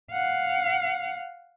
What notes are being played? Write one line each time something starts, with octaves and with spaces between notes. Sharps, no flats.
F5 F#5